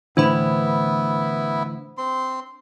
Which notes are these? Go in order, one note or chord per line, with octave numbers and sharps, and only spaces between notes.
A2 D3 E3 B3 D4 E4 C5 B5
C4 C6